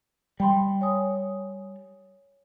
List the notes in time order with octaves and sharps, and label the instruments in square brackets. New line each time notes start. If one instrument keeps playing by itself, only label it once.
[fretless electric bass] G3 [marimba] G5 B5 C6
[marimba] C#5 G#5 D#6